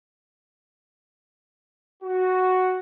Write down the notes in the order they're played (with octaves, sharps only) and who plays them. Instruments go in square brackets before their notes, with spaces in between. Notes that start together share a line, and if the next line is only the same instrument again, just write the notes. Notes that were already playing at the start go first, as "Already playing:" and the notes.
[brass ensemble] F#4